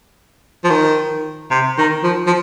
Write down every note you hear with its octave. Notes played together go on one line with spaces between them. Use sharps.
F3
D#3
C3
D#3
F3
F3